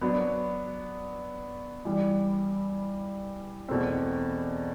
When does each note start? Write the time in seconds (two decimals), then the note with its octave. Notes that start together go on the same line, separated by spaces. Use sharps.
0.01 F#3 B3 D4 F#4
1.85 G2 E3 G3
3.69 E2 B2 A3 C4